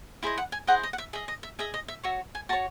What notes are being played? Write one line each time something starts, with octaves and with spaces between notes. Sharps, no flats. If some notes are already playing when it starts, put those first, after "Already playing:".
E4 G#4 C5 D#5 E5
F#5
G#5
E4 G#4 C5 D#5 F#5
D#5
F#5
E5
G#4 D#5 E5
D#5
E5
G#4 D#5 E5
D#5
E5
F#4 C#5 E5
G#5
F#4 C#5 A5